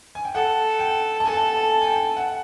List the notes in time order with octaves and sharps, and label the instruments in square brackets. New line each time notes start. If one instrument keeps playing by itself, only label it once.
[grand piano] G#5
G5
[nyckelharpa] A4 [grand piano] F#5
[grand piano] G5
A5
[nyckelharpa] A4 [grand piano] G#5
[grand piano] A5
G#5
G5
F#5